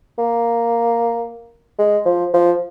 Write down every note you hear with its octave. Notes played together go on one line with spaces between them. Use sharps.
A#3
G#3
F3
F3